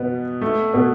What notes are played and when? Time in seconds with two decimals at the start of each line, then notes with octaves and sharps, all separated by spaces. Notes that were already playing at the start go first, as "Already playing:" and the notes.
Already playing: B2 B3
0.41 A3
0.74 B2 B3